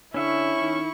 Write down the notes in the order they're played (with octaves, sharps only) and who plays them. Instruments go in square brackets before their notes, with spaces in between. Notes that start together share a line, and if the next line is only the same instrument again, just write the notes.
[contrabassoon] D3 [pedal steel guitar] C#4 E5 [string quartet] E4 C#6
[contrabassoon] D#3